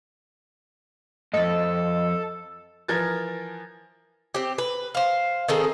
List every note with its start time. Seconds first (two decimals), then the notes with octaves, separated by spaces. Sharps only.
1.34 F2 G#2 A4 D#5
2.88 E3 F3 A#4 G#6 A6
4.35 C4 G4
4.58 B4
4.95 C5 F5
5.48 D#3 C4 G#4 A4